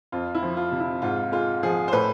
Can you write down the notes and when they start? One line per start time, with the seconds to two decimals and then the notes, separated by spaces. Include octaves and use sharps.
0.12 F2 F4
0.35 E4
0.43 F3
0.57 F4
0.72 C3
0.80 E4
1.02 G#2 F4
1.32 G#3 F4
1.63 F3 G#4
1.88 C5
1.93 A2 B4